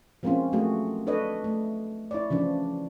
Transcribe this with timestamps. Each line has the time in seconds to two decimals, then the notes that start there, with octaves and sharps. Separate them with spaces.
0.23 F3 G#3 A#3 C4 C#4 F4
0.53 F#3 A3 A#3 F#4 G#4
1.07 D4 A4 B4 C#5 D#5
1.44 A3
2.11 E4 C#5 D5
2.30 C#3 E3 F3 D4